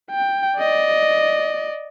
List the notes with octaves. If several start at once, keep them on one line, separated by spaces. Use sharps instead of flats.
G5
D5 D#5